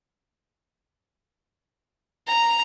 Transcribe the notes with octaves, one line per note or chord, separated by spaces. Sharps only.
A#5